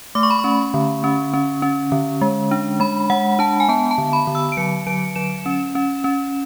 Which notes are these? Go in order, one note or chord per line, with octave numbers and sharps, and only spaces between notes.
A3 D6
C#6
B5
C#6
C#4
D3
C#4
C#4
C#4
D3
G#3
D4
G#3 B5
G#3 F#5
D4 A5
G#5
B3 A5
A5
D3
B5
D3
E6
D7
F#3 C#7
F#3 D7
F#3 E7
C#4
C#4
C#4